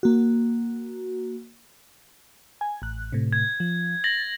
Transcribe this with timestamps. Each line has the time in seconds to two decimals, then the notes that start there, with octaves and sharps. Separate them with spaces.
0.03 A#3 F#4
2.61 G#5
2.82 A1 F#6
3.12 A2 C3
3.33 G#6
3.60 F3
4.04 A6 A#6 F#7